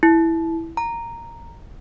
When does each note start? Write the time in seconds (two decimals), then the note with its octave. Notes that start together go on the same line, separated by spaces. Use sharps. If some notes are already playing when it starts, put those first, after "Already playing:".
0.03 E4
0.77 A#5